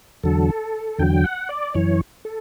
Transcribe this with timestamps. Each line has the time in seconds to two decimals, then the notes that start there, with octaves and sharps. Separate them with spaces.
0.23 E2 D3 F#3 A4
0.98 E2 D3 F#3 G5
1.24 F#5
1.49 D5
1.74 F#2 E3 C#5
2.25 A4